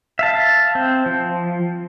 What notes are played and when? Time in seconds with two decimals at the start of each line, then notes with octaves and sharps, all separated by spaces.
0.19 E5 F5 A5
0.75 C4
1.06 F3